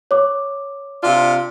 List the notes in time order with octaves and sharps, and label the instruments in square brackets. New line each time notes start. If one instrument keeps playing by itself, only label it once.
[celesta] C#5 D6
[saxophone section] C3 D4 F4